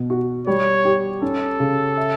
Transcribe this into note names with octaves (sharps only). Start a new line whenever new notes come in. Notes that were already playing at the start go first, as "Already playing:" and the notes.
Already playing: B2
F#4
G3 C#5
G4
C#4 A4
C#3
E5